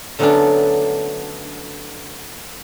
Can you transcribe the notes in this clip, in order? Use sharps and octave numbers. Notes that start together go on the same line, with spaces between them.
D3 F#3 A3 B3 C#4 D4